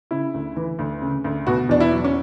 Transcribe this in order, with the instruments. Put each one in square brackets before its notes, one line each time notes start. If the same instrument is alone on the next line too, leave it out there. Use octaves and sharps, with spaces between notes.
[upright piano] C#3 E4
D2
E3
D2
C#3
D2
B2 F#4
E2 D4
E4
F#3
C#4